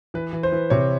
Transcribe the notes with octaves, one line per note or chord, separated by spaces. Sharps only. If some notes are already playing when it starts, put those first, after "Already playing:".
E3 B4
E3
C5
E3
C3 C#5